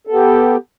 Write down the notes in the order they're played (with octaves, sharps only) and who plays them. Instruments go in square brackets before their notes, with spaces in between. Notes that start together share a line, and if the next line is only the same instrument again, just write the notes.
[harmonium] A4
B3
G4